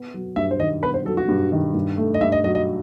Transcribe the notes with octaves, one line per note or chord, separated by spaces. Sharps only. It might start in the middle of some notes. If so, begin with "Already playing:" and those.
Already playing: B3
F#3
G2 E5
C5
D#3 D#5
B3 B4
C5
F#3 A4
F#4
G2
D#3
G2
A3
D#5
G2 E5
D#5
F#3 D#5
D#5